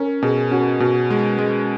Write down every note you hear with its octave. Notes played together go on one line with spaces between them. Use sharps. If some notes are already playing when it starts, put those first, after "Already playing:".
Already playing: C#4 A#4
B2 G#4
C#4 F#4
B2 F#4
G#3
G#3